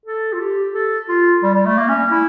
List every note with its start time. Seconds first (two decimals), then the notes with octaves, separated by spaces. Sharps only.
0.06 A4
0.33 F4
0.40 G4
0.74 A4
1.08 F4
1.43 G3
1.54 G3
1.66 A3
1.78 A#3
1.89 C#4
2.11 E4